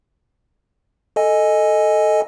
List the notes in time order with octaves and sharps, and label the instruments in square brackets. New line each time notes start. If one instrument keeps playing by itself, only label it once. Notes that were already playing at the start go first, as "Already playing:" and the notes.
[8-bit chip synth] A4 D#5 G#5